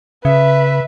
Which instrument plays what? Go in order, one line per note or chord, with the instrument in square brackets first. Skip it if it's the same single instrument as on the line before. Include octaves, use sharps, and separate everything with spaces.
[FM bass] C#3 [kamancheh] B4 [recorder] E5